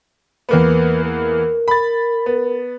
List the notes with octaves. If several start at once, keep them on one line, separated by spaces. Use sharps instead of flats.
E2 A#3 B3
A#4
B5 A6
B3